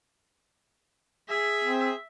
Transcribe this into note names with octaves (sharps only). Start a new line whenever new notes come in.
G#4 E5
C4